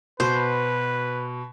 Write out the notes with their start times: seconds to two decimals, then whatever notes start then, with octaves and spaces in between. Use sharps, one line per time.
0.20 B2 B4 C5